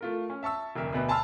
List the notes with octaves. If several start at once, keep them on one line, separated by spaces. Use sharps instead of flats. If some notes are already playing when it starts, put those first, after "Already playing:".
A3 F4 A#4
C#4
E5 A5 C#6 E6
F1 D2 A#4 E5
D2 B2 B4
G#5 A5 B5 C6 E6 F6